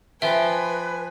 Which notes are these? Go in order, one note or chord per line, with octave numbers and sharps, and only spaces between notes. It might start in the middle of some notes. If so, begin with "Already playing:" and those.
F3 B4 E5 G5 G#5